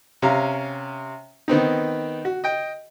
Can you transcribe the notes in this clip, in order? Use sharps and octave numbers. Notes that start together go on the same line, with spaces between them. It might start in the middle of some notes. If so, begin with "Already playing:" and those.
C3 C#4 F5 A#5
D#3 B3 C4 D#4
F#4
D#5 G5